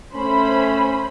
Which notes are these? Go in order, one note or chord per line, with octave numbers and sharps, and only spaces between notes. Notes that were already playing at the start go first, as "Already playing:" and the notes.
A3 C#4 C5 B5